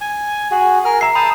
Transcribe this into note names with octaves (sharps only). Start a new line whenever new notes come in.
G#5
F#4 G#4
G#4 A#4 F6
E5 A#5 C7
G5 A5 B5 D#6